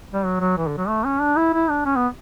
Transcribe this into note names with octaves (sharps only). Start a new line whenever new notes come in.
G3
F#3
F#3
E3
D3
F#3
A3
C#4
D4
E4
E4
D4
C#4
B3